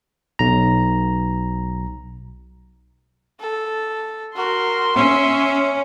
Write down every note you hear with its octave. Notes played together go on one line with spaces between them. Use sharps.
B1 A#5
A4
F#4 A#4 C6
C#4 E5